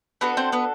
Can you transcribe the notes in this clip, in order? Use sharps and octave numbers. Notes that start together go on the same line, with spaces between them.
B3 D4 F#4 A4 B4
C4 C5
B3 B4